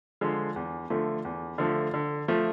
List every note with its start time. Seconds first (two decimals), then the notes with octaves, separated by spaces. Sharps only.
0.21 D3 F3 G#3
0.56 E2
0.90 D3 F3 A3
1.25 E2
1.58 D3 F3 A3
1.94 D3
2.28 F3 A3